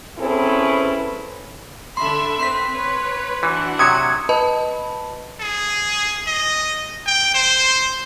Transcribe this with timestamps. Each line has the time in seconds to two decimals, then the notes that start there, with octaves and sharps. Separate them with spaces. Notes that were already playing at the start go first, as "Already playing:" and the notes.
0.19 C4 C#4 E4 G#4 A4 B4
1.97 D3 E5 B5 C6
2.39 C4 B4 C6 B6
2.72 B4 C#5
3.43 E3 D4 F#4 F#5
3.79 C3 F#3 D#6 G#6 C#7
4.29 B4 D#5 A5 B5
5.40 G#4
6.27 D#5
7.06 G5
7.34 C5